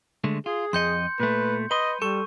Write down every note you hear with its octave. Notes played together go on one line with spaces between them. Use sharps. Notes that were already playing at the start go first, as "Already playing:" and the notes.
D3 G#3 A3
F4 G#4
F2 D#5 C6 G6 C#7
A#2 A3 B4
B4 D#5 C6 D#7
G3 A4 C#6